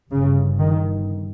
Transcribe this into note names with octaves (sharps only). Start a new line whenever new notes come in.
G1 G2 C#3
D#3